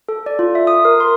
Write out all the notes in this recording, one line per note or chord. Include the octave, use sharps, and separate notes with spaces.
A4
D5
F4
E5
D#6
A#4
C6